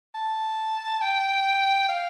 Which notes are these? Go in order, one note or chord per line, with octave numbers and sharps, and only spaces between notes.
A5
G5
F5